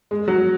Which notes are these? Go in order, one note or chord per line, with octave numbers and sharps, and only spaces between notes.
G#3
F#3